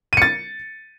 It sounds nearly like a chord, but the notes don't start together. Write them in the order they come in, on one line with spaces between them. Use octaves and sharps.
D#7 C#7 A6